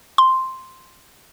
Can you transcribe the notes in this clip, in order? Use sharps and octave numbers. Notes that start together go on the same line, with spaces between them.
C6